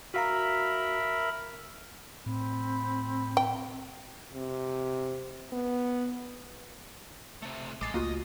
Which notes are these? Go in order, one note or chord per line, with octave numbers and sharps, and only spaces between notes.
F#4 A#4 E5 F5 A#5 B5
A2 C4 B5
G5
C3
B3
C3 A3
A1 G#3 D6 A6 C7
C#2 A3 A#3 F4 F#4 D#5